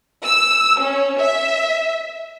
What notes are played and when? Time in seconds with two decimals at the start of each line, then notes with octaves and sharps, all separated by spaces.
0.24 E6
0.79 C#4
1.19 E5